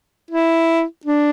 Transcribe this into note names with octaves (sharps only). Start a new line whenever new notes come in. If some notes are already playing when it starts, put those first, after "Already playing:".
E4
D4